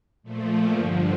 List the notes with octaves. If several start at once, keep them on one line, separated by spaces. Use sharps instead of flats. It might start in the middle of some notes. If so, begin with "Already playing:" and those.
A#2 F3 A3
G2 D3 F3